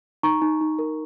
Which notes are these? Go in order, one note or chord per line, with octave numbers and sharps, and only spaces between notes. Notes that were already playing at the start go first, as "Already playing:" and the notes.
D#4 A#5 C#6
D#4
D#4
A#4